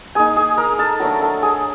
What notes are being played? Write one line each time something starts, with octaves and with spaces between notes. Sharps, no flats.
A#3 D#4 G#4 G#5
G#4 G#5
A#4 A#5
A4 A5
F#3 A3 D4 A#4 A#5
A4 A5
G#4 G#5